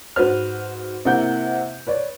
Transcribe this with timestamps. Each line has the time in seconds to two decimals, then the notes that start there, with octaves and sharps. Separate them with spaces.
0.16 G#2 F#4 B4 C5 F6
1.05 C3 A#3 E4 F#5 G6
1.87 B4 C#5 D5